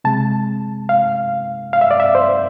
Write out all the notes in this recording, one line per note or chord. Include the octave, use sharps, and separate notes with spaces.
C3 G#3 A5
F5
F5
E5
D5
E5
C5